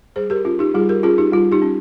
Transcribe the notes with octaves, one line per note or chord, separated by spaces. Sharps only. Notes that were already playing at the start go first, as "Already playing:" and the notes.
G3 G#4 C5
G4 A#4
C#4 F4
D#4 G4
G3 F4 G#4
G4 A#4
C#4 F4 G#4
D#4 G4
G3 F4
D#4 G4
C#4